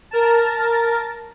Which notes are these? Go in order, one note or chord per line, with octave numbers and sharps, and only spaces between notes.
A#4 A5